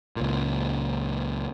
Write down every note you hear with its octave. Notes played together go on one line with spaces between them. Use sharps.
C#2 A#2